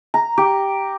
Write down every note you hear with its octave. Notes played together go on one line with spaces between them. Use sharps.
A#5
G4